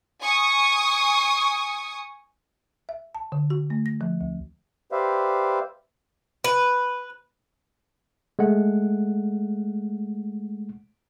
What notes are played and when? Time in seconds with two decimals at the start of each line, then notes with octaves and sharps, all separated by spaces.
0.22 G#5 C#6 D#6
2.89 E5
3.15 A5
3.32 D3
3.50 F#4
3.70 A3
3.86 A#6
4.01 F3
4.21 D2
4.92 G4 B4 C5 D5 E5 F5
6.44 B4
8.39 G#3 A3 F#5